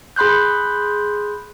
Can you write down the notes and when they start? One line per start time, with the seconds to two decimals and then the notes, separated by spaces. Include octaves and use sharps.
0.16 G#4 B5 C6 F#6 G6